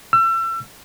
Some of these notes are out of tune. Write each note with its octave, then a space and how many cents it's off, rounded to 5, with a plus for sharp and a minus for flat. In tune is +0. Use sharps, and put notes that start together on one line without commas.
E6 +35